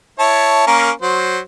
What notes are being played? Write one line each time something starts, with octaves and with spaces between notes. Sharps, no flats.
E4 C#5 A5
A#3 C#4 A#4
F#3 C5